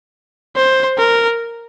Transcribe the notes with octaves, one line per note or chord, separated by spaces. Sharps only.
C5
A#4